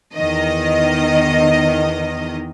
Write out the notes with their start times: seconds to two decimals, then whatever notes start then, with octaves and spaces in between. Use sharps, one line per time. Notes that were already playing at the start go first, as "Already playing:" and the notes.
0.15 E2 D#3 D#5